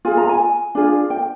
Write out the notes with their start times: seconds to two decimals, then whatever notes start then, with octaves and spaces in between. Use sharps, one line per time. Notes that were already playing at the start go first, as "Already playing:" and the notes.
0.05 F4 G#4 G#5
0.17 A#5
0.29 G#5
0.75 D4 F4 G#4
1.10 G5